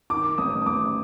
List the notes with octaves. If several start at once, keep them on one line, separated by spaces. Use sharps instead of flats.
D#3 D6
A1 D#6
D#6
A1 D6